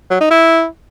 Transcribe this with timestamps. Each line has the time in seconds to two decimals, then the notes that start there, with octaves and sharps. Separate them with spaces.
0.10 F#3
0.21 D#4
0.31 E4